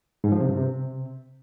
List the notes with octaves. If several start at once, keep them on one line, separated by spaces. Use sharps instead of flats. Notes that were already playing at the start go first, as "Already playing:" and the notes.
G#2
F3
C3
G2
C3